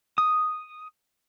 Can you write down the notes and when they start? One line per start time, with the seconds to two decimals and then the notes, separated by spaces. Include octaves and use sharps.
0.18 D#6